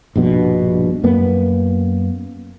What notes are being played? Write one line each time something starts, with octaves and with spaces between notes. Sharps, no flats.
A#1 G2 B2
F#2 A#3 B3